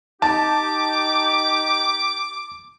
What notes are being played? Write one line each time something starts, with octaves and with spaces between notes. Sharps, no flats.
D#4 G4 A5 D6